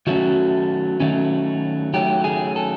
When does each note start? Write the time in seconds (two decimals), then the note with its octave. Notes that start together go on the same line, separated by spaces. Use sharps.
0.07 D#3 F#3 A3 C#4 F#4
1.00 D#3 F#3 A3 C#4
1.94 D#3 F#3 A3 C#4 G4
2.24 G#4
2.56 A4